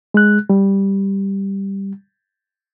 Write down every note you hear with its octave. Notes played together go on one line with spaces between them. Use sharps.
G#3 F#6
G3